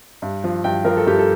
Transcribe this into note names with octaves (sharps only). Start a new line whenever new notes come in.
G2
F3
G2 G5
F3 A#4
A4
G2 G4
A4